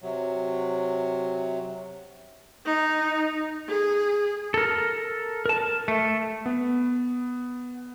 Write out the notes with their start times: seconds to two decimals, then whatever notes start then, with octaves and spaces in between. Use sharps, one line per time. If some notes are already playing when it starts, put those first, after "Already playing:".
0.02 C3 F#3
2.66 D#4
3.68 G#4
4.54 A4 A#4
5.46 A#4 A5
5.88 A3
6.46 B3